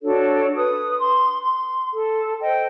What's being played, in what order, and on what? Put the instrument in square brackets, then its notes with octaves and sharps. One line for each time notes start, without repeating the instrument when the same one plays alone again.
[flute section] D4 F#4 A4 C#5
B4 D#6
C6
C6
A4
C5 D#5 G5